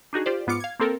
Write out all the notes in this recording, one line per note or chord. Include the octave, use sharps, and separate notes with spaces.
D4 D#4 F#4 G#4
F4 G4 C5 D5
G#2 B3 F4 D6 C#7
F5 G#6
A#3 C4 A4 A#4